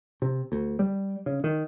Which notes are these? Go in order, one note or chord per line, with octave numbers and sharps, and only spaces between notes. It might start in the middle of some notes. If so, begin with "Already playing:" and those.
C3
D2
G3
C#3
D#3